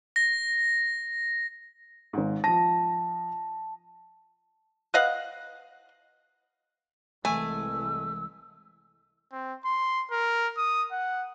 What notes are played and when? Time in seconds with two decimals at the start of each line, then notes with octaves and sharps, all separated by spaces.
0.16 A#6
2.13 G#1 G#2
2.44 F3 A5 A#6
4.94 B4 D#5 F5 F#5
7.25 C2 E3 G#3 A3 G#5 E6
9.32 C4
9.65 C6
10.11 A#4
10.57 D#6
10.92 F#5